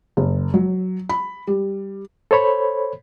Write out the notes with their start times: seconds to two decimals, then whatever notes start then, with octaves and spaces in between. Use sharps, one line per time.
0.17 F#1
0.54 F#3
1.09 B5
1.47 G3
2.31 A4 C5 C#5 B5